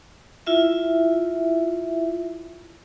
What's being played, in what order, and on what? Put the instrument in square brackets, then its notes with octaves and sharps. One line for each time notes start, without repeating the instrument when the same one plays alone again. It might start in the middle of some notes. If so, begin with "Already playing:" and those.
[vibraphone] E4 F4 E5